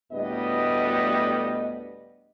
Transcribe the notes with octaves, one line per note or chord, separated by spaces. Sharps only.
D2 A2 G3 B3 D4 D#5